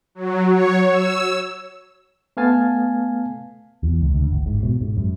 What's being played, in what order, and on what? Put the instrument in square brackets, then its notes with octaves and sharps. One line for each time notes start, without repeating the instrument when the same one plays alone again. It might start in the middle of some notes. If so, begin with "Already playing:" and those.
[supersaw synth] F#3
C#5
E6
[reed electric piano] A3 B3 F5 G#5 A5
[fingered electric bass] E2
C#2
D2
G1
G#2
B2
G#2
F#2